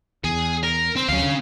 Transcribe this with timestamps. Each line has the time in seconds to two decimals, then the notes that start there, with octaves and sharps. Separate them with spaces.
0.24 E2 G#4
0.63 A#4
0.96 C4
1.09 D2 F#3 C#4 F5
1.22 D3